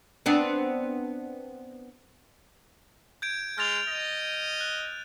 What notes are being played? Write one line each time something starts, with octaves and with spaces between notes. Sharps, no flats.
B3 C4 D4
G6 G#6 D7
G#3 F6 A6 F7
D#5
F#6